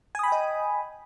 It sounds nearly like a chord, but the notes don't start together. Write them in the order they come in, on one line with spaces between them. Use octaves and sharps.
G#5 D#6 B5 G5 D#5